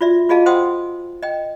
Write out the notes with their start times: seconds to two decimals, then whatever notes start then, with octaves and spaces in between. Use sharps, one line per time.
0.01 F4 F#4 D5 E5
0.29 F4 F#4 G#4 D#5 F5 A5
0.46 C5 F#5 G5 C6 D#6 E6
1.23 D#5 G5